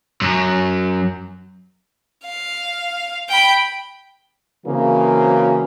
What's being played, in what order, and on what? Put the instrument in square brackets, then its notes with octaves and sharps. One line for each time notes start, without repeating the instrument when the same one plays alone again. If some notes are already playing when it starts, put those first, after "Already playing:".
[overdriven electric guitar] F#2
[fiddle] F5
G5 B5
[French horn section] C#3 E3 F#3 A#3 C4